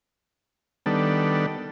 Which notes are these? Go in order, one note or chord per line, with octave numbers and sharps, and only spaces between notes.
D#3 G3 B3 D4 A4